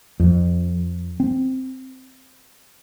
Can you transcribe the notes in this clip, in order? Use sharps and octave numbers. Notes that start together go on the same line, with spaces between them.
F2
C4